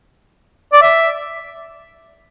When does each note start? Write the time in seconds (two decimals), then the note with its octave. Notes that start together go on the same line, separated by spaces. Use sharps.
0.73 D5
0.82 E5